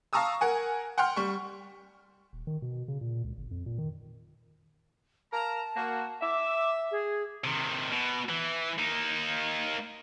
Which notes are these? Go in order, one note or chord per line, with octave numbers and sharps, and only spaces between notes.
F5 A5 A#5 C#6 D#6 E6
A#4 F#5 G#5
F#5 G5 C6 F6
G3 C#6
D#1
D#3
B2
C#3
A#2
C#2
G1
F2
A#2
D#3
A#4 F5 A5 A#5
A#3 F#4
E5 D6
G#4
C3 D#3
B2
E3
A#3 D#4